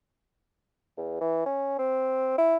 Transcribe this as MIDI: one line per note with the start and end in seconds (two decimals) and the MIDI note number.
0.97 1.18 40
1.21 1.44 52
1.46 1.74 61
1.79 2.35 60
2.38 2.57 64